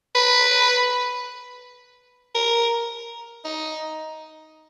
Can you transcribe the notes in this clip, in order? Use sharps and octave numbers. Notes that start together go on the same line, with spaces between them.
B4
A#4
D#4